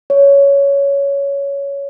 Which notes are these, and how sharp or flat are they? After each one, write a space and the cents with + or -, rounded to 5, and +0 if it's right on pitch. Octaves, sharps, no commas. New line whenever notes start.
C#5 +10